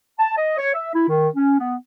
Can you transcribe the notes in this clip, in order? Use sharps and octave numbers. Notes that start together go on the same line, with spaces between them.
A5
D#5
C#5
E5
E4
D#3
C#4
B3